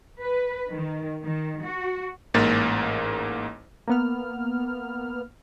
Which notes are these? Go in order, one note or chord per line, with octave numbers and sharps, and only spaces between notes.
B4
D#3
D#3
F#4
A1 G#2 A#3 A6
A#3 B3 F6